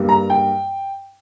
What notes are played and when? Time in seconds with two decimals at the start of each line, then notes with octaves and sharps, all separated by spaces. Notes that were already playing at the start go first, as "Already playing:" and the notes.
Already playing: G2 G3 A#3
0.09 A#5
0.30 G5